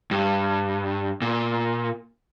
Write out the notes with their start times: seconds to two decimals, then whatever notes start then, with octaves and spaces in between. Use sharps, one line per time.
0.11 G2
1.22 A#2